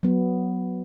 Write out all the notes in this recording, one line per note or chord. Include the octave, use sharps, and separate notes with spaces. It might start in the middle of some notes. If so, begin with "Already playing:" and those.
F#3 B3